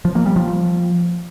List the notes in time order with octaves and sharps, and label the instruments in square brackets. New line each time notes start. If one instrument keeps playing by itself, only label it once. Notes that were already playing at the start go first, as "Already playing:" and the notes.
[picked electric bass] F3
A#3
G3
F3